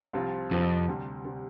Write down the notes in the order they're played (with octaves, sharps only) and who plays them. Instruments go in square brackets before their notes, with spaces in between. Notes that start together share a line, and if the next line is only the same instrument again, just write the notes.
[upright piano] C2 C3 F3 C4 F4
[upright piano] C2 C3 F3 C4 F4 [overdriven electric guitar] F2
[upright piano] D2 C3 G3
C3 G3